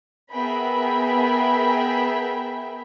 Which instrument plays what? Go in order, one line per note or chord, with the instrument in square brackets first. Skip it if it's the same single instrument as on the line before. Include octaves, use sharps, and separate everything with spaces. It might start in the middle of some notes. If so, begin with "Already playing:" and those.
[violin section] B3 G#4 A#4 E5 G5 B5